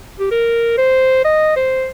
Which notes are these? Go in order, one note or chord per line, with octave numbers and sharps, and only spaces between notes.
G4
A#4
C5
D#5
C5